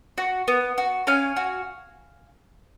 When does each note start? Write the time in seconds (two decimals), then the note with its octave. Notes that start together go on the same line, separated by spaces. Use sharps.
0.18 F#4
0.48 B3
0.78 F#4
1.07 C#4 F5 G#5
1.36 F#4